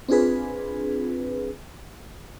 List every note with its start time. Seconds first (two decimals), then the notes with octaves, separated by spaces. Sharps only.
0.09 C4 D4 F4 G#4 B4